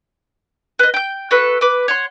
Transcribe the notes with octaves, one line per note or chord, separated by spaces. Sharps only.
B4 D#5
G5 G6
F#4 A4 B4
B4 D6
C#5 F#5 C6